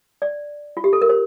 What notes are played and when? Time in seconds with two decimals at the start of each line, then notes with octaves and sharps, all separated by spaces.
0.22 D5
0.77 F4
0.84 G4
0.93 A4
1.02 A#4
1.09 C5